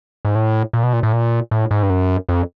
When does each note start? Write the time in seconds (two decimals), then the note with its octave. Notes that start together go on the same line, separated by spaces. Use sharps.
0.25 G#2
0.35 A2
0.73 A#2
0.83 B2
0.93 A#2
1.03 A2
1.13 A#2
1.51 A2
1.71 G#2
1.83 G2
1.90 F#2
2.29 F2